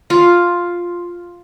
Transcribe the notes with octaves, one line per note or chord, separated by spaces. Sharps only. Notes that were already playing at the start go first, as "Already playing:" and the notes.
F4 F5